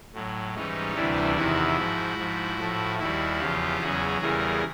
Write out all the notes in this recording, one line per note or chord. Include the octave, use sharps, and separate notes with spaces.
A2 F#3
G#2 E3 G3 C#4 D#4
D2 C3 E3 G3 D4 E4
E2 C3 D#3 E4 F#4
G#2 F3
G#2 F3
A2 F3
D#2 D#3 G3 E4 F#4
E2 C#3 F3 F4 G4
E2 C#3 F#3 F#4 G#4
E2 C#3 E3 G3 G#4 A#4